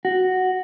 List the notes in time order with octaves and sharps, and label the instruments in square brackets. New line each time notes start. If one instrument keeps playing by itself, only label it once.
[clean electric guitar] F#4